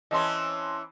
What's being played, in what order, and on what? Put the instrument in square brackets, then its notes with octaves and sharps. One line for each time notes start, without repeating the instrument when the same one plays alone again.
[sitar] E3 C4 C#4 [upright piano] D#5 A5 C6